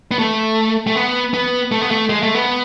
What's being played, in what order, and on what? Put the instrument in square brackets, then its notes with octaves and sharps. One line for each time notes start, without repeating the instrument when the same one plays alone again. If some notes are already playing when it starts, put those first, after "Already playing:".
[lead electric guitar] B3
A3
A3
B3
B3
A3
B3
A3
G#3
A3
B3